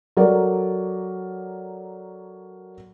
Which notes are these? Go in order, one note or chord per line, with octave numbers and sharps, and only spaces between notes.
F#3 A4 A#4 D5